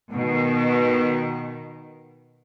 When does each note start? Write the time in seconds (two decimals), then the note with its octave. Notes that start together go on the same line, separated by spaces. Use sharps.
0.12 B2 D#3